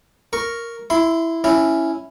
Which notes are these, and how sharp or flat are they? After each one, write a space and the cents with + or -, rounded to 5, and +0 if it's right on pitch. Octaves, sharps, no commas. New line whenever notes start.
A#4 +0 C#6 +0
E4 +0 C6 -25
C#4 +0 E4 +0